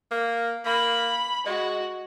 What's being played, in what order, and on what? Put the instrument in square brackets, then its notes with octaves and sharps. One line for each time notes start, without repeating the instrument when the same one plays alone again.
[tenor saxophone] A#3
[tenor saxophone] A#3 [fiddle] B5
[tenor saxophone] G#3 [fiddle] F#4